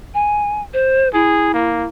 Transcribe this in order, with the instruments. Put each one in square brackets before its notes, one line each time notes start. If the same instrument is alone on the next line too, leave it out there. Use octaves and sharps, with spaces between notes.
[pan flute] G#5
C5
[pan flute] E4 [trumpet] G#4
[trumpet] A#3